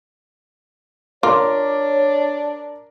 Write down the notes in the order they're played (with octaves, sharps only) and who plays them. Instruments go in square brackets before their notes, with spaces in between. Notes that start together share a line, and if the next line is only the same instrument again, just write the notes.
[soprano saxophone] D4 [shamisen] F4 [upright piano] A#4 D6 [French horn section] C#5